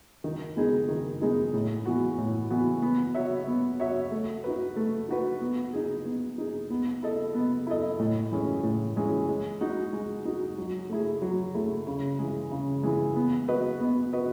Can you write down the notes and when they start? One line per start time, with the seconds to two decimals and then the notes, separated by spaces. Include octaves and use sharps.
0.24 D#3
0.57 G#3 B3 D#4 G#4
0.88 D#3
1.22 G#3 B3 D#4 G#4
1.53 A2
1.86 E3 B3 F#4
2.18 A2
2.50 E3 B3 F#4
2.82 B3
3.15 F#4 C#5 E5
3.47 B3
3.80 F#4 C#5 E5
4.12 A3
4.44 D#4 F#4 B4
4.76 A3
5.09 D#4 F#4 B4
5.41 B3
5.73 D#4 G#4
6.05 B3
6.38 D#4 G#4
6.70 B3
7.02 E4 A4 D#5
7.35 B3
7.67 E4 A4 D#5
7.99 A2
8.32 E3 G#3 C#4
8.63 A2
8.96 E3 G#3 C#4
9.29 G#3
9.61 D#4 F#4
9.93 G#3
10.25 D#4 F#4
10.58 F#3
10.89 A3 E4 G#4
11.22 F#3
11.55 A3 E4 G#4
11.87 C#3
12.19 E3 G#3
12.51 C#3
12.83 E3 G#3
13.16 B3
13.48 F#4 B4 D#5
13.81 B3
14.13 F#4 B4 D#5